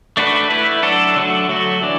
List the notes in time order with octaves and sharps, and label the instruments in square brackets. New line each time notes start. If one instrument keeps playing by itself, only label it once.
[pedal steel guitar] A3 D4 F#4 B4
A3 E4 B4
F#3 D4 F#4 A4
D3 F#3 A3 F#4
F#3 A3 F#4
E3 D4